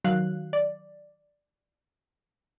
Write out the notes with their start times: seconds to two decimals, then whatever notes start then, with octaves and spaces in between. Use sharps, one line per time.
0.04 D#3 F#3 F5 F#6
0.53 D5